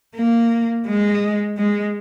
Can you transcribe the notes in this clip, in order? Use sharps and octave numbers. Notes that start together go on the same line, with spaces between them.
A#3
G#3
G#3